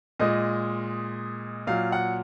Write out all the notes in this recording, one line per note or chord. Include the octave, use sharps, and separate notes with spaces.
A#2 G#3 D#5
A#2 F#3 F5
F#5